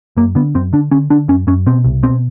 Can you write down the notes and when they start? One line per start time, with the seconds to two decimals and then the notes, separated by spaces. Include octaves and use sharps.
0.17 F#2 A#3
0.35 D3 B3
0.55 F#2 C4
0.73 D3 D4
0.91 D3 C#4
1.10 D3 D4
1.28 F#2 C#4
1.47 F#2 C#4
1.67 B2 C4
1.84 C2
2.03 B2 C4